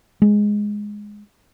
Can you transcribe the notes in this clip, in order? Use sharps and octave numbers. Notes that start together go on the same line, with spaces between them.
G#3